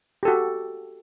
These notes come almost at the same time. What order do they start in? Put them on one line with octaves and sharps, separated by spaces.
G4 A4 F#4